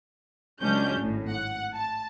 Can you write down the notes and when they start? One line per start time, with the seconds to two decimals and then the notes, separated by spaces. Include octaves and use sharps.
0.62 C#2 F#3 C#4 D4 G6
1.00 G#1 A2
1.31 F#5
1.74 A5